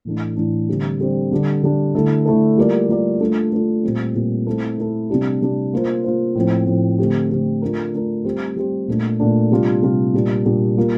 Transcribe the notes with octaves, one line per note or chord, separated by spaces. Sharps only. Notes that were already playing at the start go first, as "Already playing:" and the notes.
A2 E3 A3 D4
A2 E3 A3 D4
D3 G3 C4
D3 G3 C4
D3 G3 D4
D3 G3 D4
D3 A3 E4 A4
D3 A3 E4 A4
G3 A#3 F4 A#4 D5
G3 A#3 F4 A#4 D5
A3 D4 F4 A4
A3 D4 F4 A4
A#2 G3 C4
A#2 G3 C4
A3 C4 E4 A4
A3 C4 E4 A4
C3 G3 D4 G4
C3 G3 D4 G4
A#3 F4 C5
A#3 F4 C5
A2 F3 C4
A2 F3 C4
D3 A3 C4 G4
D3 A3 C4 G4
A3 D4 F4 A#4
A3 D4 F4 A#4
G3 C4 G4 C5
G3 C4 G4 C5
A#2 A3 D4
A#2 A3 D4
C3 G3 D4 F4
C3 G3 D4 F4
A#2 G3 D4
A#2 G3 D4
G3 A#3 F4